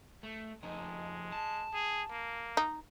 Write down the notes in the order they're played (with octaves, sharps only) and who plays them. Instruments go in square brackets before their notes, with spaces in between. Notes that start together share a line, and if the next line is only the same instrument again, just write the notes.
[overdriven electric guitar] A3
[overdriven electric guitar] F2 D#4 [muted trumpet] G#3
[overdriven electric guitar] A5
[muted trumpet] G#4
A#3
[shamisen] D#4